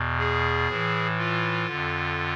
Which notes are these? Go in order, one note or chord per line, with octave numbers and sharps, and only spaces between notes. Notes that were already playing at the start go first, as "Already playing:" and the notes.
Already playing: E2 B2
G#4
A2 E3
F4
F2 D3